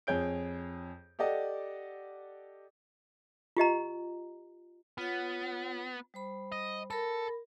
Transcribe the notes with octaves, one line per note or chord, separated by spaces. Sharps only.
F2 G#4 C#5 G6 D7
G4 A4 D5 D#5 F#5
F4 G4 D#5 A#5
B3 F4 C#5 F#5
G3 C5 B5
D#5
A4 A#4 B5